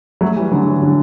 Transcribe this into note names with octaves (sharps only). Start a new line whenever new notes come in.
F#3 A3
E3 G3
D3 F#3
E3 G3
D3 F#3